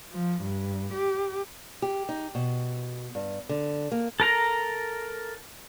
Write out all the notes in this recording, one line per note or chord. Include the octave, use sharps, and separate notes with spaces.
F3
G2
G4
G4
D#4
B2
G2
D3
A#3
A4 A#4 A#5